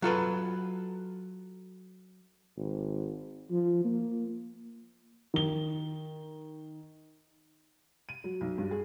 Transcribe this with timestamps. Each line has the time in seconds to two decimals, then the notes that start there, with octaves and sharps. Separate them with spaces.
0.02 F#3 F4 A4 B4
2.57 G#1
3.51 F3
3.85 A#3
5.34 D#3 G7
8.09 D#7
8.24 F#3
8.41 B1
8.58 G2
8.71 G#4